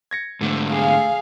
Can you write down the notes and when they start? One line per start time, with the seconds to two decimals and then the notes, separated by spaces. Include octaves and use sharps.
0.11 G#6 A#6 C#7
0.41 G#2 D3 A3 A4
0.71 G#4 F5